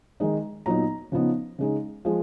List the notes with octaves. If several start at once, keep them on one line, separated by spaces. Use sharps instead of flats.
D#3 G#3 D#4
A#2 F#3 B3 D#4 A#5
C#3 F3 B3 D#4
C#3 G#3 D#4
F3 G#3